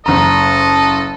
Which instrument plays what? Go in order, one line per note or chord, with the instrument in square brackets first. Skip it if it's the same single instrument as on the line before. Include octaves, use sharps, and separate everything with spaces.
[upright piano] F#1 A#5 [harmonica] A4 D#5